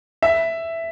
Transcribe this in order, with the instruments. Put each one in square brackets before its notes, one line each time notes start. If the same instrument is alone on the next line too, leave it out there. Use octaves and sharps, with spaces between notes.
[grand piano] E5